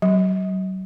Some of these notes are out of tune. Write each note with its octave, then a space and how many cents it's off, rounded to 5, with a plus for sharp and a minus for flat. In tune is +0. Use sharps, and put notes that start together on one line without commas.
F#3 +35